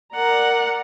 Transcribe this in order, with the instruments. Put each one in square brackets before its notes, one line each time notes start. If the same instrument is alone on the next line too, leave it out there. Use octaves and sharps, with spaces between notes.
[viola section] A#4 D5 A#5 [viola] F#5